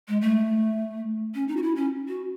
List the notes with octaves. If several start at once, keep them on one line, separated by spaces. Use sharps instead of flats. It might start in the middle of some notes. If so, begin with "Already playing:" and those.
G#3
A3
C#4
D#4
F#4
E4
C#4
F#4